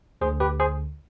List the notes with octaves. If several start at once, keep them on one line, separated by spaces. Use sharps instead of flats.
D2 D3 G#4 C5
G4 B4
G#4 C5